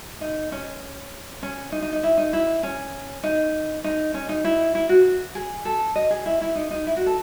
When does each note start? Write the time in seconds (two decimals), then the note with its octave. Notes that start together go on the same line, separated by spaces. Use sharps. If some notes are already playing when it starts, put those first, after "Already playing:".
0.21 D#4
0.52 C#4
1.43 C#4
1.72 D#4
1.82 D#4
1.93 D#4
2.03 E4
2.18 D#4
2.33 E4
2.63 C#4
3.24 D#4
3.84 D#4
4.14 C#4
4.29 D#4
4.45 E4
4.75 E4
4.89 F#4
5.35 G#4
5.65 A4
5.96 D#5
6.11 G#4
6.26 E4
6.41 E4
6.55 D#4
6.71 D#4
6.87 E4
6.96 F#4
7.06 A4